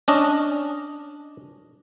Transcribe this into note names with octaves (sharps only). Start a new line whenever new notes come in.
C#4 D4 D#5